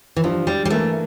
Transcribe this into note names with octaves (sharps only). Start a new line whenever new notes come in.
E3
G2 F3
G3
G3
E3 A3 A#3